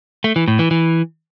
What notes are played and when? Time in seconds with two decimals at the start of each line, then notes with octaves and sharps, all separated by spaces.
0.24 A3
0.36 E3
0.48 A2
0.59 E3
0.71 E3